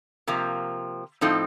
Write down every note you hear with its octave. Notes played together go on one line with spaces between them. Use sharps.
C3 F3 A#3
A2 F3 C4 D#4 A4